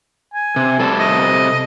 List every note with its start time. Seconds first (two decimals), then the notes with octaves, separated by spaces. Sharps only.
0.34 G#5
0.56 C3
0.80 C3 G3 A4
0.99 D#5